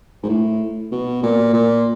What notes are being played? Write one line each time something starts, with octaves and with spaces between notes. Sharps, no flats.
G#2
A2
B2
A#2
A#2